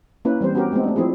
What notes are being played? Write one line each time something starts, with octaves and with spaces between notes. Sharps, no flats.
A#3 C#4 E4 B4
E3 G3 C4 C5
B3 C#4 F#4 G4 A#4
G#3 A3 B3 C4 D#4
A3 D4
F3 C4 E4 G#4